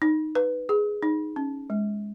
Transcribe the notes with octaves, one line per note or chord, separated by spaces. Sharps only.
D#4
B4
G#4
D#4
C#4
G#3